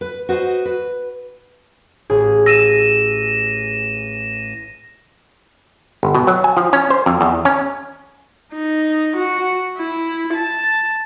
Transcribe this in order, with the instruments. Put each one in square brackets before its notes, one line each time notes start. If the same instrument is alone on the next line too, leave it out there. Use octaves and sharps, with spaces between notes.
[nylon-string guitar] B4
F#4 B4 C5 D#5
B4
[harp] A1 G#4
[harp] E6 [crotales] A#6 D#7 E7
[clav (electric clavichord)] G1
B2
F#3
G#5
F3
C#4
C5
F2
E2
C#4
[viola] D#4
F#4
E4
A5